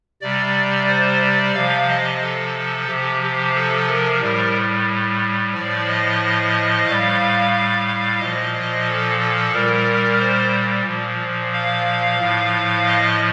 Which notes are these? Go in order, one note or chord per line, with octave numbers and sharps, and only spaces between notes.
C3 G3 D5
C5
D5
C3 F3 F5
D#5
A4
C3 F3 G4
G4
A4
A#4
A2 G3
A2 F3 D5
D#5
A2 G3 F5
F5
F5
A#2 D#5
F3
D#5
A4
A4
A#2 G3 A#4
C5
A#2 F3
F5
A2 F3
D#5